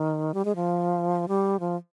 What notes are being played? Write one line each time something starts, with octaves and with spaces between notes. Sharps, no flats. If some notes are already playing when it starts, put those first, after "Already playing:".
Already playing: D#3
G3
G#3
F3
G3
F3